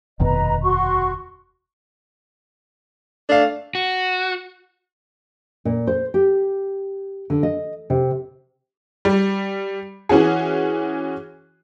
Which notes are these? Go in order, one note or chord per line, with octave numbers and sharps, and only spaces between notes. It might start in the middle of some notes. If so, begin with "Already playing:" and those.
F1 D#2 B2 B4 D#5 A#5
F#4 C6 C#6
A3 D4 F5
F#4
A#2
C5
G4
D3
D#5
C3
G3
E3 C#4 F#4 G#4